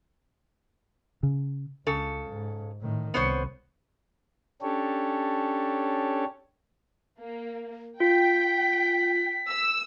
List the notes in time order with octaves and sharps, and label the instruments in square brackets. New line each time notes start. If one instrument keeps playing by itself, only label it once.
[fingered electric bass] C#3
[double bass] C#2 [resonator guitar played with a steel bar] C#3 A4
[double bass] G#2
A2 D#3
[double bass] C2 [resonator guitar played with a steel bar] B3 C5 C#5
[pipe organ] C#4 D4 G4 A4 C#5
[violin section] A#3
[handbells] F4 [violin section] G5 [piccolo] B6
[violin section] E6